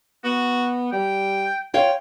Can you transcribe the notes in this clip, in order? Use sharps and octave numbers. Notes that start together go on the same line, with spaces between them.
B3 F#4
G3 G5
F4 C#5 F5 G5